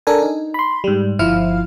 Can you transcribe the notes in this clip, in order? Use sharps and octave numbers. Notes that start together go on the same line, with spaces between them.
D4 A4 A#4 G#5
D#4
B5 C6
G#2 G3
G1 F3 E4 F4 F5 F6